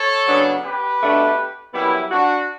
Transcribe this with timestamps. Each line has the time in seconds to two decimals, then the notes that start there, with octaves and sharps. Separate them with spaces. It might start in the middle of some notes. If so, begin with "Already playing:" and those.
Already playing: A4 C#5
0.26 C#3 F#3 B3 D4
0.64 G4 B4
1.00 B2 A3 D4
1.74 F#2 E3 G3 B3 E4
2.11 D4 F#4